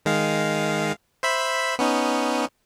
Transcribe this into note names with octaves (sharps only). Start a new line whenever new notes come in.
D#3 G#3 F5
C5 E5 B5
B3 C#4 D#4